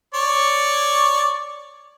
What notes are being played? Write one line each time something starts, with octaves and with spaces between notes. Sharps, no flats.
C#5 D5 C#6